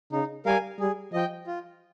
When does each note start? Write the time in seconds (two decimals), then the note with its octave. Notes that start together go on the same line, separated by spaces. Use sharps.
0.12 C#3 D#4
0.45 G3 A#4 F5 G#5
0.79 G3 G#4
1.13 F3 D#5 G5
1.47 F4